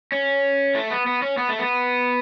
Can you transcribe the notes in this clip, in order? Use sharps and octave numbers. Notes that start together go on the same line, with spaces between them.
C#4
A3
B3
B3
C#4
B3
A3
B3